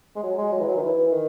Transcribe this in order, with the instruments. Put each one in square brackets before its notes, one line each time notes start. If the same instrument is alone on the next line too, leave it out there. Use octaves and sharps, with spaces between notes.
[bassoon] G#3
F#3
G#3
F#3
E3
F#3
D#3
E3
E3
D#3